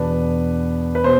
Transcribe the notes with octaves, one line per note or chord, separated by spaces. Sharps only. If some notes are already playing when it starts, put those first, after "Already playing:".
Already playing: E2 B2 B3 D4 B4
B4
B2 C5